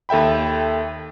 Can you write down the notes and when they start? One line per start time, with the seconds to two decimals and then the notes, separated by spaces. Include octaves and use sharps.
0.09 D#2 A4 E5 G5 B5